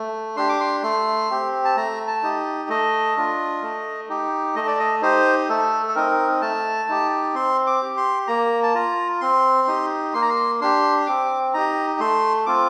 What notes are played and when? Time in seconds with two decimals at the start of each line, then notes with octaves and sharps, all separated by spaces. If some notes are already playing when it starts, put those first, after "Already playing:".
Already playing: A3
0.37 D4 G4 C6
0.49 D6
0.60 C6
0.83 A3 C6
1.30 C4 G4
1.65 A5
1.76 A3 A#5
2.07 A5
2.23 D#4 G4
2.69 A3 D#5
3.17 D4 F4
3.62 A3
4.09 D#4 G4
4.55 A3 D#5
4.67 D5
4.79 D#5
5.02 D#4 G4 C5
5.49 A3 A4
5.88 A4
5.95 C4 D#4 A#4
6.41 A3 A5
6.89 D#4 G4
7.34 C4 C6
7.67 D6
7.82 G4
7.97 C6
8.27 A#3 A#5
8.63 A5
8.74 F4 A#5
9.21 C4 C6
9.68 D#4 G4
10.14 A#3 C6
10.22 A#5
10.30 C6
10.61 D4 G4 C6
11.07 C4 D6
11.54 D#4 G4 A#5
12.00 A3 C6
12.46 C4 F4 D6